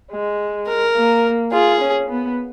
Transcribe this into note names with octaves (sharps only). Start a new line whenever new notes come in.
G#3
A#4
A#3
F4 G#4
C#4
B3